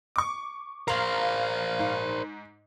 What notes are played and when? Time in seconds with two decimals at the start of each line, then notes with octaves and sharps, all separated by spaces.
0.16 C#6 D6
0.88 A#4 C5 F5 A#5 F#7
1.79 G#2